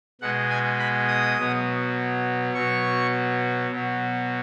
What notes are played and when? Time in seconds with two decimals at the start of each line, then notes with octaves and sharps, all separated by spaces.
0.21 B2 G#3 F#5
0.50 G#5
0.79 B5
1.08 D#6
1.38 B2 F#3
2.54 B2 F#3 C#6
3.71 B2 F#3